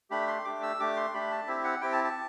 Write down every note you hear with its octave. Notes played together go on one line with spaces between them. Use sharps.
A3 D4 G4 B5
C6
A3 D4 G4 D6
E6
A3 D4 G4 D6
C6
A3 D4 G4 B5
A5
C4 E4 G4 E5
F#5
C4 E4 G4 G5
A5
A5